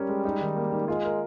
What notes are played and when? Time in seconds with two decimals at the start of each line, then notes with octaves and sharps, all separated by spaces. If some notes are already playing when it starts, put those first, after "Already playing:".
Already playing: G3 C#4 G4 A#4
0.09 G#3
0.25 D#4
0.41 D#3
0.57 A#3
0.72 D#3
0.88 G#3 F4
1.04 A#4